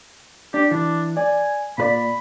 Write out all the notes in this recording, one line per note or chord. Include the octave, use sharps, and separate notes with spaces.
D4 G4
E3 D4
D5 G#5
A#2 B4 D5 B5